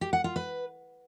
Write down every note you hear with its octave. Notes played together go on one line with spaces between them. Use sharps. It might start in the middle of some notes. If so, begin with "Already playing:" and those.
G4
F#5
F4
B4